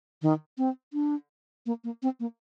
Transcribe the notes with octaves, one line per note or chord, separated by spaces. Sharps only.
D#3
C4
D4
A#3
A#3
C4
A#3